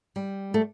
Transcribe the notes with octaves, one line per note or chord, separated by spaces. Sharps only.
G3
A3